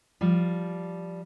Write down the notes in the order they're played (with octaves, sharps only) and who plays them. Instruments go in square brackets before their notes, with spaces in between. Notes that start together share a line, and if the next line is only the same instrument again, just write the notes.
[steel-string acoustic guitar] F3 G3